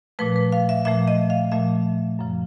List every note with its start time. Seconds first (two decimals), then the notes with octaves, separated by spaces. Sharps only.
0.19 A#2 F3 A3 B4
0.36 B4
0.52 F5
0.69 E5
0.85 A#2 F3 A3 E5
1.08 D#5
1.30 F5
1.52 A#2 F3 A3 E5
2.19 F#2 C#3 F3